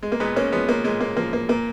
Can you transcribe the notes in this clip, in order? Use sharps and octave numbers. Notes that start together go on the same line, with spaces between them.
G#3
A#3
A#2 G#3 B3
A#3 C#4
F3 G#3 B3
A#3
A#2 G#3
A#3
F3 A#3
A#3
A#2 A#3